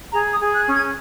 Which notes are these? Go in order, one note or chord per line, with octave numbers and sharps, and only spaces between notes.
G#4 A#5
D#6
G#4
F#6
C#4
G#6